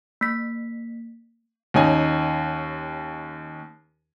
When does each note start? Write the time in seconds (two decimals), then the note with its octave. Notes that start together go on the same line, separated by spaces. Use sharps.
0.21 A#3 B6
1.74 D#2 C#4 D#4 G#5